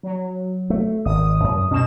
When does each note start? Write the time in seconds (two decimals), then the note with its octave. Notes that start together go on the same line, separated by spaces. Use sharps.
0.03 F#3
0.70 A3
1.05 G#1 D#6
1.44 F#2
1.70 D2 B2 C#4 E7